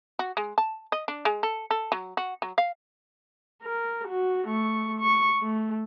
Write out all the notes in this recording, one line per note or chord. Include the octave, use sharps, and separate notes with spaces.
F#4
G#3
A5
D#5
D4
G#3
A4
A4
F#3
F#4
F#3
F5
A#4
F#4
A3 C#6
C#6
A3